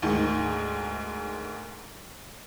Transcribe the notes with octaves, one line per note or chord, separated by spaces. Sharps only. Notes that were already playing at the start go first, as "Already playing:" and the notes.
D2 G#2 D#3